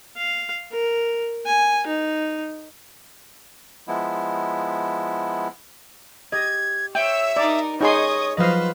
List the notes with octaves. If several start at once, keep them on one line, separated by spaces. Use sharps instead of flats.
F5
A#4
G#5
D#4
F3 G#3 B3 E4
G4 D#5 G#6
C#5 E5 G5 E6
D#4 A#4 D5
D#4 G#4 C#5 D#5 C6 C#6 D#6
F3 F#3 F4 B4 C5 D#5 F5